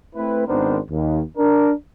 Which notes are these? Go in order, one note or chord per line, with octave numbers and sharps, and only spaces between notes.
A3 C4 E4 B4
G#1 D#3 B3 D4 A#4 C5
D#2
D4 A#4